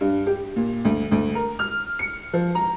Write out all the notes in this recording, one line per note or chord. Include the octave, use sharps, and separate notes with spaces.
G2
G4
A#2
D2
D2
A#4
F6
C#7
F3
A#5